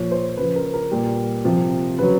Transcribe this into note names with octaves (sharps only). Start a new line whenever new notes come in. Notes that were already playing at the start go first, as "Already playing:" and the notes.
Already playing: A#2 F3 C#5
C5
C#3 F3 B4
A#4
A#4
A#2 G3
C3 F3
C#3 F#3 B4